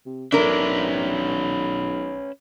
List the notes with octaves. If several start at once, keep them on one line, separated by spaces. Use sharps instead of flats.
C3
B1 C#4 D4 A#4 B4 E5